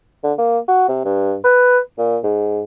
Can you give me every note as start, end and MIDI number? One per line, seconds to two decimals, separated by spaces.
0.24 0.33 50
0.38 0.58 58
0.68 0.88 66
0.89 1.04 48
1.05 1.35 43
1.44 1.79 71
1.99 2.18 46
2.24 2.62 44